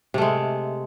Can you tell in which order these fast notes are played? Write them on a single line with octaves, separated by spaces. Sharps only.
C3 A3 G#3